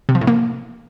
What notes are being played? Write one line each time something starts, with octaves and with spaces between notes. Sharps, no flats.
C3
F3
A2
A#3